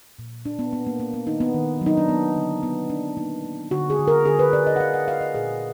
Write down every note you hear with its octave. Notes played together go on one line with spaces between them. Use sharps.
A#2
A#2 D4
B3
A#3 B3
A#3
A#3
B3
D#3 D#4
B3
D#3
F#3
D#4
D4
A#3 B3
D3
D3 B3
F#3 D4
A#3 D#4
A#3
D3 F#4
G#4
D3
A#4
D3 G#4
B4
D3 D5
D#5
F#5
D3 F5
F#5
D3 F5
D#5
A#2 G#4